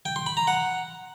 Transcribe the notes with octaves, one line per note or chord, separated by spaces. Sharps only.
G5
C6
B5
A#5
F#5